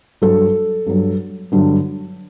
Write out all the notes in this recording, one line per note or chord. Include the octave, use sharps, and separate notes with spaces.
G2 F#3 A4
G2 F#3
G2 D3 F#3